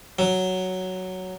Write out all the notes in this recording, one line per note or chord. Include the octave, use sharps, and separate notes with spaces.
F#3